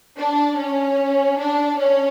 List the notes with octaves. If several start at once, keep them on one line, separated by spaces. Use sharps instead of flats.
D4
C#4
D4
C#4